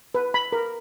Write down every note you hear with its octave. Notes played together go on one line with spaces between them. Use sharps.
B4
B5
A#4